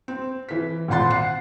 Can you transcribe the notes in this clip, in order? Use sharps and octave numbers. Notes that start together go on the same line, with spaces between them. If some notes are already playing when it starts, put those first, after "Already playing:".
C4
E3 B6
G#1 A#2 C4 F#5 C6 A6
F#5 C7